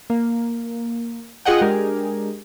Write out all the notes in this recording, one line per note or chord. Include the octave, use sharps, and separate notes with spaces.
A#3
F4 G#4 D#5 F#5 G5
G#3 D4 G4 G#4 A#4